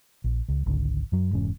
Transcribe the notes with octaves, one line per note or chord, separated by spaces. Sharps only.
A#1
C#2
G#1 C#2 D3
F#2 F#3
F1 G#2 E3 C#4